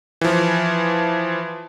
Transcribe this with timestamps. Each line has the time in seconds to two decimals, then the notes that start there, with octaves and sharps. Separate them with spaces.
0.21 E3 F3